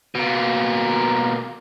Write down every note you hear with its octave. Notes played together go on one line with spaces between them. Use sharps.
B2 A#3